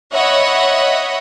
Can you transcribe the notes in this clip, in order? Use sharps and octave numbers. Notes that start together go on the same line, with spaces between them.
C#5 D#5 E5 F#5 B5